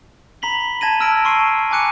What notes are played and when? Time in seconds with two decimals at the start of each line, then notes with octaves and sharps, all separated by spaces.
0.42 A#5 B5 B6 F#7 G7
0.81 A5 G#6 A#6 D#7
1.00 A5 E6 F6 A#6 D7
1.24 A5 C6 C#6 C7 D#7
1.71 G#5 A#5 D6 F#6 C#7 D#7